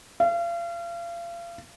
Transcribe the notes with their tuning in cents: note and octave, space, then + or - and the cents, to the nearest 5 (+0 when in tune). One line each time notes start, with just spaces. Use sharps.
F5 -35